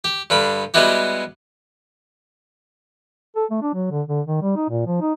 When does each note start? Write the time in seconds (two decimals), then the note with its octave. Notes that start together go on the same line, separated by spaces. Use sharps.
0.04 G4
0.30 G2 D3 G3 B5
0.74 G3 G#3 B3 E4 F#4 G4
3.36 A4
3.51 A3
3.62 D4
3.74 F#3
3.91 D3
4.08 D3
4.27 D#3
4.42 G3
4.56 D#4
4.70 A#2
4.87 F3
5.01 D#4